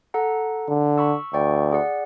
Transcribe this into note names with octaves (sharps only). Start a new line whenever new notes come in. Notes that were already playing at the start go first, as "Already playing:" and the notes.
A4 F#5 A#5
D3
B5 C#6 E6
D2 D5 G5 C#6
G#4 D5 F#5